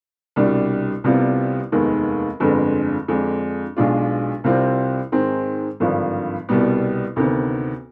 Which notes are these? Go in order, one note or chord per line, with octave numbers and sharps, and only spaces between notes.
C2 B2 G3 D4
C2 C3 G3 B3 F4
F1 D#2 D#3 G#3 B3
G1 F2 D3 G#3
F2 D3 G#3 D4
B1 B2 G#3 D4 F4
C2 C3 G3 C4 F4
G#2 D#3 G#3 C4
G#1 G2 D3 F3
C2 B2 G3 B3
D2 C3 D#3 B3